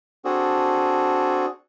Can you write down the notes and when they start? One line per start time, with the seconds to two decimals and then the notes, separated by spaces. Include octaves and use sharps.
0.25 C4 D4 F#4 G#4 A4